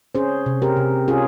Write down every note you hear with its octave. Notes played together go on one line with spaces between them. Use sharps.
C#4 G#4 C5
C3
G4 A#4
C3
C#4 F4 G#4